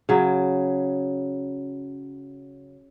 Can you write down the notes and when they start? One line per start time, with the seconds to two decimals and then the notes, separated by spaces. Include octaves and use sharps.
0.09 C#3 F#3